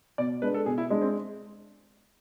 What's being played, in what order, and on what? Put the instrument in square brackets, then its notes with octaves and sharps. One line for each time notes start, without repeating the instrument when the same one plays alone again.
[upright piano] B2 [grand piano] D5
[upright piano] G#3 D4 [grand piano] B4
[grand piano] A4
[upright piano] B2 [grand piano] G#4
[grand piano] E4
[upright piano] G#3 D4
[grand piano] C4